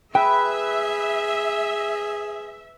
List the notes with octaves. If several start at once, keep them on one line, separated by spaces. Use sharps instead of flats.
G#4 B4 E5 G5